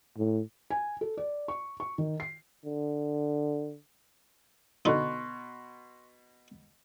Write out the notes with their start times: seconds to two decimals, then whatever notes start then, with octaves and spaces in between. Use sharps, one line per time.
0.18 A2
0.70 G#5
1.01 A4
1.17 D5
1.48 C#6
1.80 C#6
1.98 D#3
2.20 C7
2.65 D3
4.85 B2 D3 D#4 C6 C#6 F#6